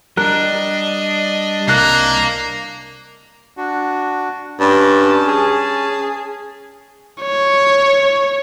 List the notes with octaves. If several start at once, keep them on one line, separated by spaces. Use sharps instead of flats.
G3 D4 A#4 D#5 F#6
C2 A#3 F#6 A#6 C7
D4 F#4
G2 C#4 A5
G#4
C#5